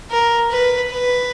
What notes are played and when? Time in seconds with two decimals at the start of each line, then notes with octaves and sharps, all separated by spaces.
0.11 A#4
0.50 B4
0.90 B4